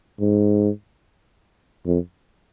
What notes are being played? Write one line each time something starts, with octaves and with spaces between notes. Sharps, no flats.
G#2
F2